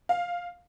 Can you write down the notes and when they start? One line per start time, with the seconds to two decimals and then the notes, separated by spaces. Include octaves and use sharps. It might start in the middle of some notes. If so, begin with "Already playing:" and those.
0.09 F5